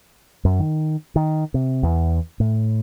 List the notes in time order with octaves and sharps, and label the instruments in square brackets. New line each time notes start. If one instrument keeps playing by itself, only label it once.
[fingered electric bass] F#2
D#3
D#3
C3
E2
A2